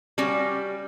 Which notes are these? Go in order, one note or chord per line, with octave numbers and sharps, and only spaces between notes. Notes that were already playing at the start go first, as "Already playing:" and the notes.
G3 C#4 F#4 G4